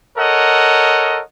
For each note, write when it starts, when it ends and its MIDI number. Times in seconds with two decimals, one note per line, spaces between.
0.18 1.21 69
0.18 1.21 70
0.18 1.21 73
0.18 1.21 75
0.18 1.21 78